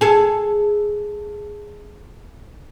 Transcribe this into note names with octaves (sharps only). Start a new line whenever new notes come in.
G#4 A4